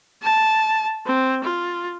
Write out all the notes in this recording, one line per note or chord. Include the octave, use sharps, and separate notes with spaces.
A5
C4
F4